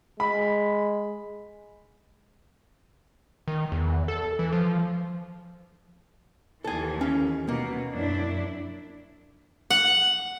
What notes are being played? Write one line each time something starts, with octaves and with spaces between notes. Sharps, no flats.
G#3 B5
D#3
E2
A4
E3
F3
D#2 E3 A4 G#5
C#4
B2 A#3
F#2 D4 E4
F#5